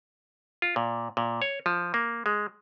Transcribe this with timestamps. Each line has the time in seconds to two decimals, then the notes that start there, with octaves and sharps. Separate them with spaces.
0.62 F4
0.76 A#2
1.17 A#2
1.42 C#5
1.66 F3
1.94 A#3
2.26 G#3